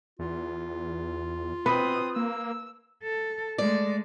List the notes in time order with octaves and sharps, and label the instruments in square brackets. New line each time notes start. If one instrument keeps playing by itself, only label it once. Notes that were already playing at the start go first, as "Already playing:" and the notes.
[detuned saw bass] E2 [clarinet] F4
[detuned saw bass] B2 [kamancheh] C4 D#6 [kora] B4
[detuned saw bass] A#3 [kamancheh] E6
[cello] A4
[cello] G#3 A3 [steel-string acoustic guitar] D5